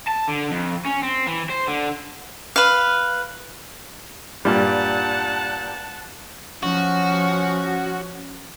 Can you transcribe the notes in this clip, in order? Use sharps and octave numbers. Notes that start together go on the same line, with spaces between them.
A5
D3
F2
C#4
C4
E3
C5
D3
B4 F5
G2 A#2 G3 F#5 A5
F3 C#4 F#4